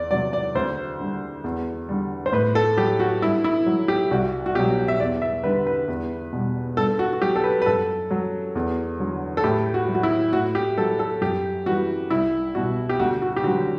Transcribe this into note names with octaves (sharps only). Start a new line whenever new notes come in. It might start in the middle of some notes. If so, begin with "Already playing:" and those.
Already playing: E2 D5
C3 F#3 D5
D5
D2 C5
D3 G3
E2
D3 G3
C5
A2 B4
A4
F#3 G4
F#4
G2 E4
E4
F#3
G4
C2 F#4
F#4
B2 F#3 G4
E5
E2 D5
E5
D3 G3 B4
B4
E2
B2 G3
G2 A4
F#4
F#4
F#3 G4
A4
B4
B4
F#2 A4
F#3
E2
D3 F#3
A4
A2 G4
F#4
F#3
F#4
E4
A2 F#4
G4
F#3 A4
A4
F#2 G4
E3 G3 F#4
C2 E4
B2 G3 F#4
G4
D2 F#4
F#4
G4
D3 F#3 F#4